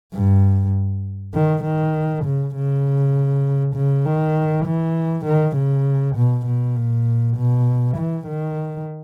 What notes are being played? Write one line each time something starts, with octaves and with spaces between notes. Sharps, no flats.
G2
D#3
D#3
C#3
C#3
C#3
D#3
E3
D#3
C#3
B2
B2
A#2
B2
E3
D#3